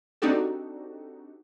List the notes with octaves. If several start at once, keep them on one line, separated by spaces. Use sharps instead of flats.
C4 D4 D#4 F#4 G4 A4